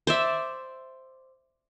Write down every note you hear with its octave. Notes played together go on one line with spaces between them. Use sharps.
C5 D5 E5